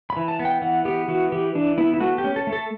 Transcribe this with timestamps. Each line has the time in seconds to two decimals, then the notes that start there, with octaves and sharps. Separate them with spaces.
0.10 B5
0.17 E3
0.28 A5
0.39 B3
0.45 G5
0.62 E3 F#5
0.85 B3 G4
1.08 E3 F#4
1.32 E3 G4
1.55 E3 D4
1.78 B3 E4
1.94 E4
2.00 A3 F#4
2.18 G4
2.24 C#4
2.36 A4
2.47 A3
2.53 A4